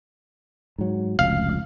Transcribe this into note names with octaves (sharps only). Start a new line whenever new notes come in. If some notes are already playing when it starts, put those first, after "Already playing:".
G#2 F#3
F1 C#2 F5